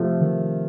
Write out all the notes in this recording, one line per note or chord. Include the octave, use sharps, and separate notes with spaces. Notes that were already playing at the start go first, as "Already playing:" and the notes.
Already playing: C3 F3 A3
D#3